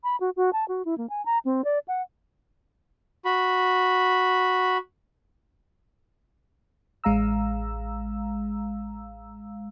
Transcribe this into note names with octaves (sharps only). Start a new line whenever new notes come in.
B5
F#4
F#4
A5
F#4
E4
A#3
G#5
A#5
C4
D5
F#5
F#4 B5
A1 G#3 F5 A#5 E6